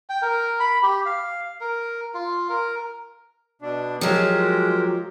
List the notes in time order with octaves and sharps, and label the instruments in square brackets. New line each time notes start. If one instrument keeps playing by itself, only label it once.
[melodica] G5
A#4
B5
G4
F5
A#4
F4
A#4
[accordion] B2 D4
[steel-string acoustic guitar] F3 F#3 [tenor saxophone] G#3 [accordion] G4 A#4